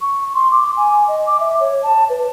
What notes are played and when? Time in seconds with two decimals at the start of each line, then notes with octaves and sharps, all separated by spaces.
0.01 C#6
0.35 C6
0.52 D6
0.77 G#5
1.08 D#5
1.27 D6
1.40 E5
1.60 C#5
1.83 A5
2.10 B4